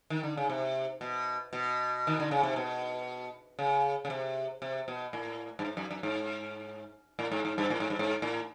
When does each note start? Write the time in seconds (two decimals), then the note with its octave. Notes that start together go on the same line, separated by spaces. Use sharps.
0.10 D#3
0.23 D3
0.37 C#3
0.50 C3
1.01 B2
1.53 B2
2.07 D#3
2.20 D3
2.31 C#3
2.43 C3
2.56 B2
3.59 C#3
4.05 C#3
4.10 C3
4.62 C3
4.88 B2
5.13 A2
5.59 G2
5.65 G#2
5.77 F#2
5.91 F#2
6.03 G#2
7.19 A2
7.32 G#2
7.45 G#2
7.58 G2
7.70 A2
7.80 G#2
7.90 G2
7.99 G#2
8.22 A2